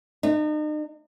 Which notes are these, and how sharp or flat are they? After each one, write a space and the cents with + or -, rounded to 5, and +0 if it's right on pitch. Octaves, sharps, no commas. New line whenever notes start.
D#4 -40